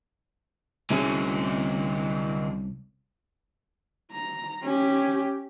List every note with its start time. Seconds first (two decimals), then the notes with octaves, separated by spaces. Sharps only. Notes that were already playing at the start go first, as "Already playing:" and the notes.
0.90 C2 D3 F#3 C#4 G#4
4.12 A#5
4.63 C#4 G4